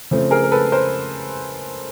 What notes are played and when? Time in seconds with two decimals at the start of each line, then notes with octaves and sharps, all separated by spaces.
0.11 C#3 F3 A3 C4
0.31 G#4 A#4
0.43 A#4
0.52 A4 B4
0.72 A#4 C5